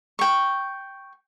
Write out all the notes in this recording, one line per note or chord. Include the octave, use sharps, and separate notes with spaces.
G5 C#6